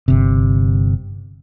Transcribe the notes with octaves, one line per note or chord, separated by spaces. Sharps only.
G1 C3